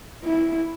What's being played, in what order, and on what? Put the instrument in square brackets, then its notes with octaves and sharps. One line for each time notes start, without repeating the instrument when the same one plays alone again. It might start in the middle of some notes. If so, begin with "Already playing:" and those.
[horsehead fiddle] E4